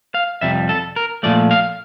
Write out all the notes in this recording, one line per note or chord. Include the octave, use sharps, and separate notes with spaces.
F5
F2 C3 G3 E5
A4
A#4
A#2 F3 A3 D5
F5